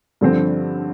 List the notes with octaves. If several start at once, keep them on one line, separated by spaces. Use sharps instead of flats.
G2 D3 F3 C4